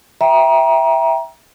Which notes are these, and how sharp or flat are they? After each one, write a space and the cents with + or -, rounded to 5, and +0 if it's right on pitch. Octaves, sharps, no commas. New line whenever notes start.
E5 +0 G5 +0 A#5 +25